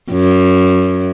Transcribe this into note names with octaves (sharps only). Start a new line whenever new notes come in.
F#2